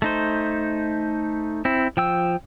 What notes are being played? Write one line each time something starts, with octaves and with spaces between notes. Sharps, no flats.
A3 D#4 C5
C4 E4
F3 G5 E6